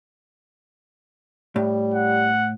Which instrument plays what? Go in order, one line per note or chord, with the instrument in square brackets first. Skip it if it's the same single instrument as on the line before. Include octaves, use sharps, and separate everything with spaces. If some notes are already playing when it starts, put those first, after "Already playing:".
[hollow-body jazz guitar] A2 [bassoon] G3
[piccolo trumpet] F#5